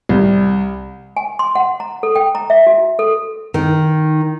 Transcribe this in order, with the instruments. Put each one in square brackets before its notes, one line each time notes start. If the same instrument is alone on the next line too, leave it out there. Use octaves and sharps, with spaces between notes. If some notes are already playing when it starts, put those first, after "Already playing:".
[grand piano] C2
[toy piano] G#5
C6
F#5
A#5
A4
G5
A#5
E5
F#4
A4
[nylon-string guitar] D#3